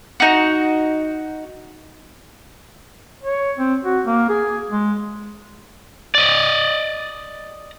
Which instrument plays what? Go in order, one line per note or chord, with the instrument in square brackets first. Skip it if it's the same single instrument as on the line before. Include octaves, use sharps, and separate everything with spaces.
[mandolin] D#4 F#4
[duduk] C#5
C4
F#4
A#3
G#4
G#3
[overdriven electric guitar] D5 D#5